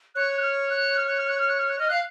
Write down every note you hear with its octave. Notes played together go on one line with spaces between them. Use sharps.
C#5 F#6
F#6
F6
F#6
F6
F#6
F6
F#6
F6
F#6
F6
F#6
D#5 F6
F5 F#6